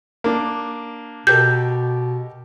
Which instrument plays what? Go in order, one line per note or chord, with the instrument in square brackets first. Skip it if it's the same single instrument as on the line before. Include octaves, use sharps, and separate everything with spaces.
[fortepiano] A#3 D4 D5
[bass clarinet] B2 [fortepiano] G4 A4 A#4 [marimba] G6